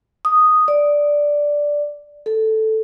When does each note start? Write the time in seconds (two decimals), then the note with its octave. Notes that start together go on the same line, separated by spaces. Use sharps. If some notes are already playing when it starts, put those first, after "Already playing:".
0.25 D#6
0.68 D5
2.26 A4